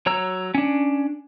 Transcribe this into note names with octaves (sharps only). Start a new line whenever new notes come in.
F#3 C#5 A#5 E6
C#4 D4